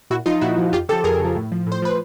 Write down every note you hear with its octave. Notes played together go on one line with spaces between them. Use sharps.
A#2 E4 F#4
F3 D#4 F4
A#2 E4 F#4
F3
F2 F4 G4
C#3 F3 G4 A4
F2 G#4 A#4
C#3 F3
A2
F3
A2
C5
F3 B4